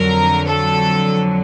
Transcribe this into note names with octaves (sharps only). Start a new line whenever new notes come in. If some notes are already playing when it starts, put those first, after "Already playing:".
Already playing: F2 D3 F#3 A#4
A4